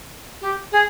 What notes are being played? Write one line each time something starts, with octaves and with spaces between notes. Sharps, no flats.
G4
G#4